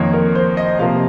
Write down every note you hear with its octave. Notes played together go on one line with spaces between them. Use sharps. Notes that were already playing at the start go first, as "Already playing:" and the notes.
Already playing: F2 D#3 A#3 C#5
A#4
C5
D#5
C3 F3 A#3 F5